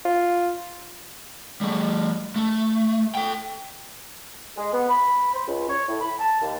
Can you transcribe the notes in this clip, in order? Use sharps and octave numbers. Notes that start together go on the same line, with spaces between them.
F4
G3 A3
A3
A4 G5
G#3
B3
B5
C5
C#2
C#5
A2
B5
A5
D#2